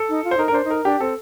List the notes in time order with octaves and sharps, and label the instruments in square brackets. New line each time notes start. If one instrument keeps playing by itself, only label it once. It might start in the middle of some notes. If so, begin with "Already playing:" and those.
Already playing: [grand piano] A4
[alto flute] D#4
F4
[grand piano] C5
[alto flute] D#4 [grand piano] A#4
[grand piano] A#4
[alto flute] D4 [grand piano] C5
[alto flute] D#4
[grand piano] A#4
[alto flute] D4 [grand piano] G4
[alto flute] C4 [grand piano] A4